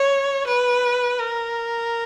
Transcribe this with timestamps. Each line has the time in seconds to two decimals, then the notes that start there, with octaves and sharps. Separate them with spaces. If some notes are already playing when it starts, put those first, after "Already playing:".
Already playing: C#5
0.47 B4
1.19 A#4